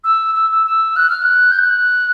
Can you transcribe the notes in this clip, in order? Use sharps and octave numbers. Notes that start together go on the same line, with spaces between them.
E6
E6
E6
E6
F#6
F6
F#6
G6
F#6